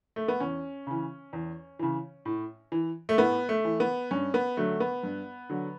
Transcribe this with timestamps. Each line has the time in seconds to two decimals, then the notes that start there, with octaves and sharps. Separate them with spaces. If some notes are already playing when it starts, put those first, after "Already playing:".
0.16 A3
0.28 B3
0.40 E2 C#4
0.87 C#3 E3
1.33 E2
1.79 C#3 E3
2.25 A2
2.72 E3
3.09 A3
3.18 A2 B3
3.49 A3
3.65 E3
3.80 B3
4.11 G2 C#4
4.34 B3
4.57 D3 F#3 A3
4.80 B3
5.03 G2
5.49 D3 F#3